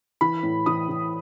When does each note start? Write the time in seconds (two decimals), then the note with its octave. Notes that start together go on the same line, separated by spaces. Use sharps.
0.21 E3 B5
0.43 A2
0.66 E3 D#6
0.89 E3